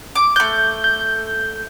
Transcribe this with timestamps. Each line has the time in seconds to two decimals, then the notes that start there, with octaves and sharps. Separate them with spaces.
0.15 D6
0.36 A3 F#6 G6
0.84 G6